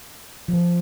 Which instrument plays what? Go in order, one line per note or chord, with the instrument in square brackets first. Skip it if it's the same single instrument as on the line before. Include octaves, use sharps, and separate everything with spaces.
[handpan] F3